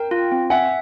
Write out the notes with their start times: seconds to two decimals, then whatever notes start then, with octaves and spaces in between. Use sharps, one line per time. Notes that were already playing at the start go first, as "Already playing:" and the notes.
Already playing: A#4 G5
0.11 F4
0.32 C4
0.50 E5 F#5 G#5